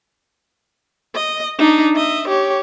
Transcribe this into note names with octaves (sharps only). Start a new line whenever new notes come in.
D#5
D4 D#4
D#5 E5
G4 C#5